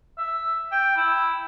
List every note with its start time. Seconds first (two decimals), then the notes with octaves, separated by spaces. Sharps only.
0.18 E5
0.72 G5
0.96 E4